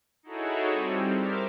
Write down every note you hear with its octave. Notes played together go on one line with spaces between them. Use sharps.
D#4 E4 F#4 G#4 A4 C#5
G3 C4
A#4 C5 E5 D6 F6